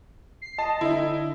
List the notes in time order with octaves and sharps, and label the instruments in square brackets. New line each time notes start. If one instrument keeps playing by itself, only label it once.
[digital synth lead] C7
[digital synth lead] D#5 [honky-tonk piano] A5
[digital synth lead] D3 [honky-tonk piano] D#4 E4